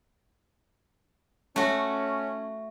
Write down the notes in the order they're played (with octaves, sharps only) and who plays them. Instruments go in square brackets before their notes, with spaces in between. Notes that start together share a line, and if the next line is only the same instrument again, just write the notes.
[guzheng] A3 F#4 [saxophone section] C#4